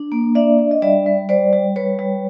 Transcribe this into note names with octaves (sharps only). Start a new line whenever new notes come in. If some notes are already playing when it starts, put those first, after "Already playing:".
Already playing: D4
A#3
D4 D5 E5
D4
D#5
G3 D5 E5
G3
G3 C5 D5
G3
G3 B4 C#5
G3